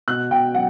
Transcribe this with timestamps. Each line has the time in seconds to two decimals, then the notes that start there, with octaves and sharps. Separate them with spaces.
0.08 B2 F#6
0.31 B2 G5
0.55 F#3 F#5